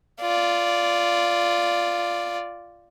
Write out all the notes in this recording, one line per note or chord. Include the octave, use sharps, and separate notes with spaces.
F4 D5